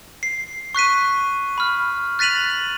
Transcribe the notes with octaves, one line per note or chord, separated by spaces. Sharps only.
C7
C#6 F#6 B6 D#7
B5 F6
F#6 A6 B6 D#7 F7 F#7